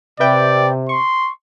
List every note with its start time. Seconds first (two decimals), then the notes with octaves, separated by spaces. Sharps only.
0.20 C3 B4 D5 E5 G5
0.89 C6 C#6